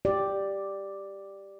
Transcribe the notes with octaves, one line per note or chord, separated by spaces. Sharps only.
G4 D5